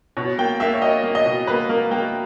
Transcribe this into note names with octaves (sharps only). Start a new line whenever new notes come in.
B2 C#5
A#3 G5
A#3 E5
C#5
A#3 D#5
A#3
D#5
B2
A#3 B4
A#3 A#4
A#3 G5